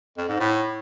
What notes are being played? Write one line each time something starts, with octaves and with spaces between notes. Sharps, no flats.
F2
G#2
A2